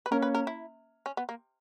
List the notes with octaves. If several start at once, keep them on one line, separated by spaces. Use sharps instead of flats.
B4
A#3 C#4 A#4
B4
A#4
E4
C#4
B3
A#3